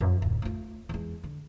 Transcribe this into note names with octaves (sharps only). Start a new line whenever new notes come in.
F2
D1
A3 F4
E2 G#3
D3